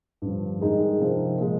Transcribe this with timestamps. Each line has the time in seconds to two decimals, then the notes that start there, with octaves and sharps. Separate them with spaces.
0.22 G2 D3 F3
0.61 G2 D#3 G#3 D#4 G#4
0.99 C3 F3 C4 D#4 A#4
1.38 A#2 F3 G#3